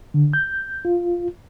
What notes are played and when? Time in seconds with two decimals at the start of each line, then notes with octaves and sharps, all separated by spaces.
0.14 D3
0.33 G6
0.85 F4